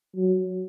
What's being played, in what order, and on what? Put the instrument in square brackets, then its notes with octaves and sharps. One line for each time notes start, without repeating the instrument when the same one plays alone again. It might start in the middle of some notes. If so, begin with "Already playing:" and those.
[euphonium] F#3